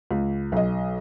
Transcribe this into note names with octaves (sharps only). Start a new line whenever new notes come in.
C#2
B1 D#5